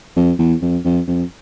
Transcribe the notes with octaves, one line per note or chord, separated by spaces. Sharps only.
F2
E2
F2
F2
F2